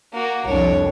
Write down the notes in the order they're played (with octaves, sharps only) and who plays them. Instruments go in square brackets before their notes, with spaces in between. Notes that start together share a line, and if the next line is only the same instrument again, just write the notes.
[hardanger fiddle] A#3 F#4
[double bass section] C2 F2 [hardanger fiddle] D4 C#5